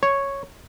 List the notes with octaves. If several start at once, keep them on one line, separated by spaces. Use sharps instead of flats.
C#5